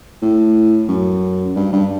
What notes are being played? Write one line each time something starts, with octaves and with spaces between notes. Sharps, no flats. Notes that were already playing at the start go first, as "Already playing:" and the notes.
A2
F#2
G2
G2